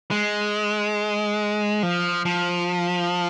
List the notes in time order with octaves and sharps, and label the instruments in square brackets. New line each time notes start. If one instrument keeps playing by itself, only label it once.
[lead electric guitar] G#3
F3
F3